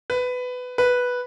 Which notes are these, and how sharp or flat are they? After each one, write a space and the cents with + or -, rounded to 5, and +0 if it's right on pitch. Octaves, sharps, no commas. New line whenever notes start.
B4 +15
B4 -5